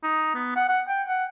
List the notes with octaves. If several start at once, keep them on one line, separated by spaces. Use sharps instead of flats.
D#4
B3
F#5
F#5
G5
F#5